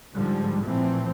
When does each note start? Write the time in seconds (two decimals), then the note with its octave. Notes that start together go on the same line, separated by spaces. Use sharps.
0.14 G#2 D3 F3 G3
0.65 A#2 E3 F3 A3 C4